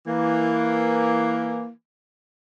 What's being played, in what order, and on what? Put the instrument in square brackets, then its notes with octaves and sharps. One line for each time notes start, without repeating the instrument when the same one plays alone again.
[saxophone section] E3 A#3